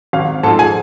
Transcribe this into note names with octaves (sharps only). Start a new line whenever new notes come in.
G#1 F5
G#2 F3 A4 A5
G#4 G#5